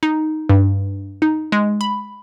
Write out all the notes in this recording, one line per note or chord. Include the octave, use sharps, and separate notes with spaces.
D#4
G2
D#4
G#3
B5